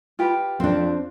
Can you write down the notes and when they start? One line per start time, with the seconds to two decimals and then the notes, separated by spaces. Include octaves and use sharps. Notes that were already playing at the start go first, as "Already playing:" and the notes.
0.19 F4 G4 B4
0.60 F2 C4 D4